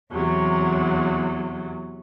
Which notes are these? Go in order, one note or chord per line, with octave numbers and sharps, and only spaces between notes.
E2 C3 F#3